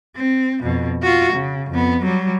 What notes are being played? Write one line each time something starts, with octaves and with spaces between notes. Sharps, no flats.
C4
F2 B2
F4 F#4
C#3
F2 B3
F#3 G3